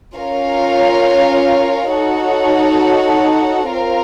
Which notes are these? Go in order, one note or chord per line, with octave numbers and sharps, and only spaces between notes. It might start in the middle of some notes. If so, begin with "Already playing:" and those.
C#4 F4 A#4 C#5 F5
D#4 F#4 A4 C#5 F#5
C4 F4 A#4 F5